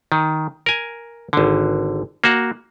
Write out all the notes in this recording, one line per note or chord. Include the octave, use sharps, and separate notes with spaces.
D#3
A#4 G#5
G#1 D3
A#3 F#4